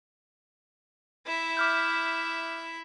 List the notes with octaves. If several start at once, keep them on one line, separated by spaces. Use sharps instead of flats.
E4 E5
D6 F6 G6